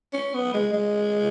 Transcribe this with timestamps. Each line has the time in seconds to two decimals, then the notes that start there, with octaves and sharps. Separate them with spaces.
0.13 C#4
0.34 B3
0.54 G#3
0.73 G#3